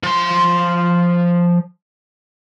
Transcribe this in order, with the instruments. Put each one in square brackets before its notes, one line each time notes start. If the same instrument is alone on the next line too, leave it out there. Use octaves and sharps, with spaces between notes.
[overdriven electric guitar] F3 C6